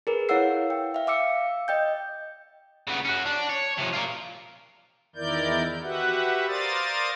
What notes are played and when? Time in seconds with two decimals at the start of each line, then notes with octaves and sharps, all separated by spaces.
0.07 G#4 A#4 B4
0.29 E4 C#5 F5 F#5 E6 C7
0.70 G5
0.94 E5 F5
1.07 F5 D6 E6 C#7
1.68 D#5 G5 G6
2.87 C#3 B3
3.05 C#4 F#4
3.26 D4
3.49 C#5
3.78 C3 F3
3.93 F4 A#4
5.16 E2 D#3 E4 A#4 D5 G6
5.82 F#4 G4 B4 E5 F#5
6.47 A#4 C5 D5 F5 D#6 A6